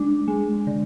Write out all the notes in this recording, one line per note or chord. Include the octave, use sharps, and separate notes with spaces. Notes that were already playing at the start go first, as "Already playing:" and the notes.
Already playing: G#3 D4
G#3
D3